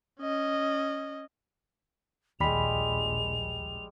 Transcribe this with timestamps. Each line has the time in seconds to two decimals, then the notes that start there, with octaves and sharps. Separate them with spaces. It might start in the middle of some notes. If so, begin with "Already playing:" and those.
0.20 C#4 D#5
2.40 A#1 D#2 G3 G#3 B5 F7